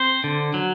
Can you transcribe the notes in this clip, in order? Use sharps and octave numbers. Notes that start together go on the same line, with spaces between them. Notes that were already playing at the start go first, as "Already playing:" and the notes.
Already playing: C4 C5
D3
F#3